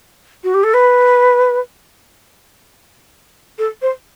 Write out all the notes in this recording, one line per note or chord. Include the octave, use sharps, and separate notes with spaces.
F#4
G4
A4
B4
A4
C5